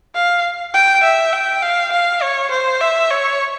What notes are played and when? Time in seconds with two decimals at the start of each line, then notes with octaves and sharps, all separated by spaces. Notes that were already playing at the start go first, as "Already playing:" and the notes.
0.15 F5
0.74 G5
1.03 E5
1.33 G5
1.63 F5
1.92 F5
2.22 C#5
2.51 C5
2.81 E5
3.11 C#5